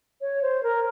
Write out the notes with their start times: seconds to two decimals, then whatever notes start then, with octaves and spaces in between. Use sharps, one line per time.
0.21 C#5
0.42 C5
0.63 A#4